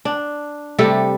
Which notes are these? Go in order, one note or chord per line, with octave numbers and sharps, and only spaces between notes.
D4
C3 G3 A3 A4